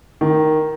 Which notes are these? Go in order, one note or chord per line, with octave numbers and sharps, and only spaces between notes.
D#3